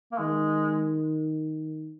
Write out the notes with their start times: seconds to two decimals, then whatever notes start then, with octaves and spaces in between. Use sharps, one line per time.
0.12 A#3
0.19 D#3 G#3